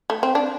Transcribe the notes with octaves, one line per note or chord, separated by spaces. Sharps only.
A3
C4
D4